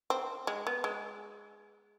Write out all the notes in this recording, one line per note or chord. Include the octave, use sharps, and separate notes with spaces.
C4
G#3
B3
G#3